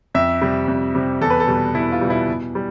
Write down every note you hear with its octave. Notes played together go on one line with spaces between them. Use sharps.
F2 E5
C3 G3
F2
C3 G3
E2 A4
B4
A4
B2 G3
E2 E4
F4
B2 G3
E4
B2
G3